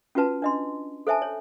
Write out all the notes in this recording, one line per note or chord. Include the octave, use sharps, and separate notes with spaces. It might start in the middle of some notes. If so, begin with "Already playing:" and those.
C#4 F4 F#4 B4 A5
D4 D#5 C6
A4 C5 E5 G#5 A5
C#5